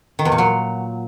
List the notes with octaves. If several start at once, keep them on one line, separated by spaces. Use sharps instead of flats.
D#3
E2
A#2
F#3